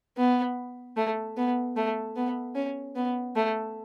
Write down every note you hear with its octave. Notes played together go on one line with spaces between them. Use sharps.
B3
A3
B3
A3
B3
C#4
B3
A3